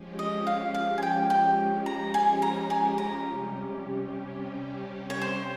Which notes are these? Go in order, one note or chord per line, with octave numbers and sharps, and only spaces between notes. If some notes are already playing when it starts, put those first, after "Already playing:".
Already playing: F3 G#3 C#4 G4
D#5
F5
F5
G#5
G5
G5
A#5
G#5
A#5
G#5
A#5
C3 G3 C#4 G4
C#5
C5